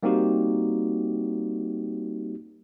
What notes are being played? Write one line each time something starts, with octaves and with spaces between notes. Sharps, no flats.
G3 A#3 C4 D#4 F#4 G4